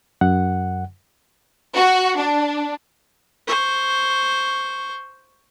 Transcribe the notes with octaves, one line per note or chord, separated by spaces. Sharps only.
F#2 F#5
F#4
D4
C5 C#6